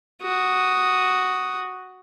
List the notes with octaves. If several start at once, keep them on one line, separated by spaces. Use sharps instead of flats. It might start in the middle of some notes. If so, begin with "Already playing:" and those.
F#4 D#6